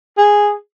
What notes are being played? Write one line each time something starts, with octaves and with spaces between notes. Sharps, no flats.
G#4